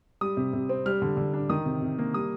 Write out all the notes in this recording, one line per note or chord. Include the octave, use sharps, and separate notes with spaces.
G3 D#6
C3
C3
C4
G3 F6
D3
D3
D4
D#3 D#6
C3
C3
A#3
G3 D#6